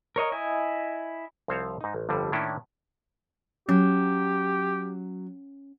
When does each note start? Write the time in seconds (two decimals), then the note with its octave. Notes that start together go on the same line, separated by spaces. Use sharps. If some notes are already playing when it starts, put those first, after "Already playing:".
0.16 A#4 C#5 D#5
0.32 E4 D#5 G#5
1.48 C2 F3 C4 C5 C#5 F5
1.81 G#2 D#4
1.95 A1
2.09 G1 F2 D3 G3
2.32 A2 D#3 A#3 C#4 D4 E4
3.69 F#3 C#4 G4